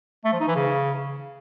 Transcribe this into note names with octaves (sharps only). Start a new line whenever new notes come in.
A3
F3
D#4
E3
C#3